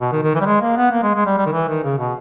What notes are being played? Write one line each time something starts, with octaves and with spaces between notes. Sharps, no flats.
B2
D#3
D#3
E3
G3
G#3
A#3
B3
A#3
G#3
G#3
G3
G3
D#3
E3
D#3
C#3
B2